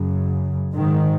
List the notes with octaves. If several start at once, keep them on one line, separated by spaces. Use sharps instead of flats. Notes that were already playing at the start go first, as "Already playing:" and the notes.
Already playing: F#2 C#3
G#2 D#3